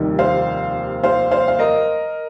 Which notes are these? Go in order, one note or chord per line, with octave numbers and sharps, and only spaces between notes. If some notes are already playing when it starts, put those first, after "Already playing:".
Already playing: F1 D#2 D#3 G3
C5 F5
C5 F5
C5 F5
F5
A#4 D#5